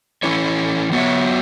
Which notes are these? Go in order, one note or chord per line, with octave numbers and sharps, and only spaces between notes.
E3 C#4 E4 C#5
F#3 B3 F#4 C#5 E5